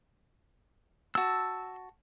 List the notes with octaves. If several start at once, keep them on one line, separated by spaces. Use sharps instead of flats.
F#4 A5 E6